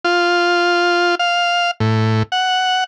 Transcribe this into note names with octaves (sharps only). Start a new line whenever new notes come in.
F4
F5
A2
F#5